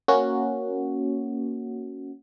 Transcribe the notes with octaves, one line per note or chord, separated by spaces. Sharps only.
A#3 C#4 F#4